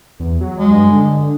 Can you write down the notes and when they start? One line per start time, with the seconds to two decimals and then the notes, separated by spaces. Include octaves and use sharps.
0.20 E2
0.41 F#3
0.57 G#3
0.71 G2
0.90 D3